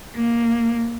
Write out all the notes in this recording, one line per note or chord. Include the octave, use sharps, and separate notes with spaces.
A#3